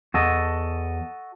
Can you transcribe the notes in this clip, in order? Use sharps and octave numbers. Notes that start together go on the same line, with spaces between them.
E2 F#4 A4 D#5